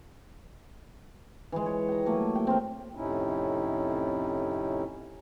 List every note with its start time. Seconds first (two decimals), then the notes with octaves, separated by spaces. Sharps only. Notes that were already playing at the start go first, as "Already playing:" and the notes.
1.52 E3 G#3
1.66 C#5
1.89 G5 A#5
2.06 F#3 A3 A#3
2.35 G5
2.47 C4 A#4
2.95 F2 A2 C3 C#4 D#4 E4